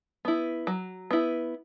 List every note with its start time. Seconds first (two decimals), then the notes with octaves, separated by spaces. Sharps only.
0.25 B3 E4
0.67 F#3
1.11 B3 E4